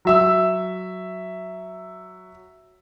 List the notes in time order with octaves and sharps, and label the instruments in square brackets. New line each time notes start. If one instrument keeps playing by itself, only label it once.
[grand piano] F#3 E5 E6